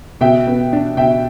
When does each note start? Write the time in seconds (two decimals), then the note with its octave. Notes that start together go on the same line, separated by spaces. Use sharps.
0.21 B2 E5 G5
0.47 B3
0.73 D4
0.97 B2 E5 G5